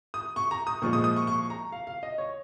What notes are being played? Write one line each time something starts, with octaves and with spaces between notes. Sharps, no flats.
D#6
C#6
A#5
D#6
A#2 F3 G#3 C#6
D#6
D#6
C#6
C#6
A#5
F5
F5
D#5
C#5